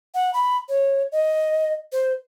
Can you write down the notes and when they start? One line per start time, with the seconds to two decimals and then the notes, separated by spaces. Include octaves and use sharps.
0.15 F#5
0.34 B5
0.69 C#5
1.12 D#5
1.92 C5